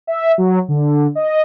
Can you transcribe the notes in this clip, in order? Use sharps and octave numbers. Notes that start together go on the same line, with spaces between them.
E5
F#3
D3
D#5